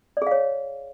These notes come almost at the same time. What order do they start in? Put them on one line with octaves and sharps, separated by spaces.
D5 G#4 F5 C#5